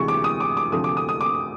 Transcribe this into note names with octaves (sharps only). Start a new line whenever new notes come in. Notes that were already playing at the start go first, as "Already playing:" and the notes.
Already playing: D2 C3 E3 G#3 C#6
D6
D#6
D6
D6
D2 C3 F3 A3 D#6
D6
D#6
D#6
D6